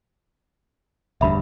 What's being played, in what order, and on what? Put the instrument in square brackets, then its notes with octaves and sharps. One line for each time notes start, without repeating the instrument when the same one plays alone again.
[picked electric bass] E1 D2 G2 [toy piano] E5 B5